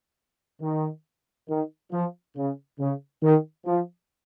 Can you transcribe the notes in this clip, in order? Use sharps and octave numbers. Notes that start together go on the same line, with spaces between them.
D#3
D#3
F3
C#3
C#3
D#3
F3